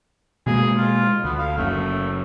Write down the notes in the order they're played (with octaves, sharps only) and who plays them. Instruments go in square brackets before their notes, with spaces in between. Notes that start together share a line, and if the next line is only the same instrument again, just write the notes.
[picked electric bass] B2 G#3 A#3 [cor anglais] G#4
[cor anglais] F4
[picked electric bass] D2 [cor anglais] B3
[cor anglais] F5
[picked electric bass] F#1 F#2 [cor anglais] A3